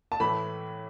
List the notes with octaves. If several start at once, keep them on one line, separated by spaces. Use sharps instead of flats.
A5
A2 E3 A3 B5